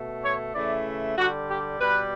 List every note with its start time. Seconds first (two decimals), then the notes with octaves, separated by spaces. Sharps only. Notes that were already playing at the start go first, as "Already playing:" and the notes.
Already playing: B2 A3
0.23 C#5
0.54 C#3 E3 A3 D5
1.17 D3 G3 F#4
1.48 G4
1.80 B2 G3 B4